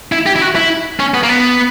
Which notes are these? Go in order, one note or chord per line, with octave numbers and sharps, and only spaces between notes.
E4
G4
E4
F#4
E4
C#4
B3
A#3
B3